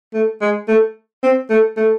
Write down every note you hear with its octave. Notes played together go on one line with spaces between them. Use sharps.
A3
G#3
A3
C4
A3
A3